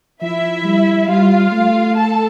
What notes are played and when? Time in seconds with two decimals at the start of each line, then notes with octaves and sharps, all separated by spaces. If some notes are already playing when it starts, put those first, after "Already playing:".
0.21 F3 E4 E5
0.65 G3
1.08 G3 F4 F5
1.52 A3
1.95 A4 A5